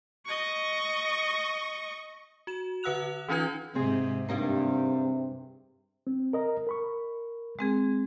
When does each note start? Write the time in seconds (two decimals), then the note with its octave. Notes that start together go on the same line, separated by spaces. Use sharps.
0.25 D#5 C#6
2.47 F#4 E7
2.83 D3 B4 F#5 E6 F#6 F7
3.29 E3 C#4 D#4 F4 B4 G#6
3.75 G#2 C3 C4 G#4
4.29 G2 C3 G3 A#3 D#4
6.07 C4
6.33 A#4 D#5 A#5
6.67 A#4 B5 C#6
7.59 G#3 C4 G#4